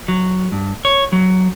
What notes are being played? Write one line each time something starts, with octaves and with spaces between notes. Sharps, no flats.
F#3
G2
C#5
F#3